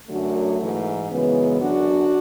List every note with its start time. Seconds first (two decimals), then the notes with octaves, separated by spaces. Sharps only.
0.09 F#2 D3 F#3 A3
0.60 G#2 E3
1.10 F#2 C#3 E3 G#3 B3
1.61 F#2 D3 F#3 D4 F#4